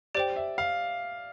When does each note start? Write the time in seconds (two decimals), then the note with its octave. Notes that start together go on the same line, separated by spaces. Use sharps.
0.15 G4 C5 D5 G5
0.36 E5
0.58 F5